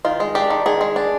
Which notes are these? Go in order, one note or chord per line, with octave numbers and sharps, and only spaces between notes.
D#3 F4
G#3
D4 G4
D#3
D#3 G#4
G#3
D4